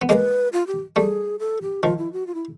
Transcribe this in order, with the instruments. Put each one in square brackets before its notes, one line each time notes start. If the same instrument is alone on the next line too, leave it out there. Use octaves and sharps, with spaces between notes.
[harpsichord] B3
[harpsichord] G#3 A#3 [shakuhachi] B4 D#5
[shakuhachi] F4
G4
[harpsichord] G3 A3 [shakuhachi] G#4
[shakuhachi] A4
G4
[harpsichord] D#3 F3 [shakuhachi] F4
[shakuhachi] E4
F#4
F4
E4